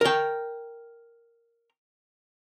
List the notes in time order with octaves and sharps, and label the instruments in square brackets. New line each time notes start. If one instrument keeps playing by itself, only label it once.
[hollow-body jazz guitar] A#4 G5